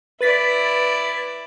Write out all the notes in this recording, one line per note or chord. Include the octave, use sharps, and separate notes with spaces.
E4 B4 D5 A6 B6